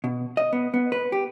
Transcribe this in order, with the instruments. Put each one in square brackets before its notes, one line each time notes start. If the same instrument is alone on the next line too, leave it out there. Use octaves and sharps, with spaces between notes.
[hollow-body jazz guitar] B2
D#5
B3
B3
B4
G4